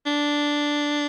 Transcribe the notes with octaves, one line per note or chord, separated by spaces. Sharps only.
D4